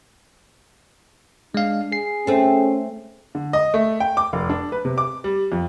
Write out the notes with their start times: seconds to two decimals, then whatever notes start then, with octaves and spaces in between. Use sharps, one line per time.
1.54 G#3 D4 F5
1.92 G#4 C7
2.27 A3 C4 C#4
3.35 D3
3.53 D#5
3.74 A3
4.00 G5
4.17 D6
4.33 F1
4.49 D4
4.72 B4
4.85 C3
4.98 D6
5.24 G3
5.52 F2